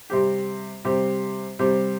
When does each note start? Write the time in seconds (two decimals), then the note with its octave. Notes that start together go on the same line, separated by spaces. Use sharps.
0.10 C3 G3 C4 G4
0.84 C3 G3 C4 G4
1.59 C3 G3 C4 G4